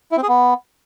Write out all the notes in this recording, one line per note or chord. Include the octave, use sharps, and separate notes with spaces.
E4
C4
G#4
B3